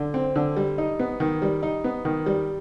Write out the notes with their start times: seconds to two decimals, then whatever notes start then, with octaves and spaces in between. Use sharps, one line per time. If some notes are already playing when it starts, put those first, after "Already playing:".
Already playing: D3
0.14 C4
0.36 D3
0.57 G3
0.78 D#4
0.99 B3
1.20 D#3
1.42 G3
1.63 D#4
1.84 B3
2.05 D#3
2.26 G3